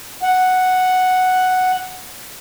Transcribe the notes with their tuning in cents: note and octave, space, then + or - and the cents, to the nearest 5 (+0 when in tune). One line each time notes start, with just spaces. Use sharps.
F#5 +0